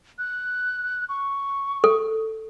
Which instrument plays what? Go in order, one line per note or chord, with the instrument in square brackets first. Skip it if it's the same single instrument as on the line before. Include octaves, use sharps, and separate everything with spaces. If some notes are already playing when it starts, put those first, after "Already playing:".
[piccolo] F#6
C#6
[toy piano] A4